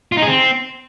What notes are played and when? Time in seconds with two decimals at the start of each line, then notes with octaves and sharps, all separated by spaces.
0.12 F4
0.17 D#4
0.22 G#4
0.27 C4